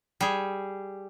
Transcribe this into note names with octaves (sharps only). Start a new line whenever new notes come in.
G3 G#4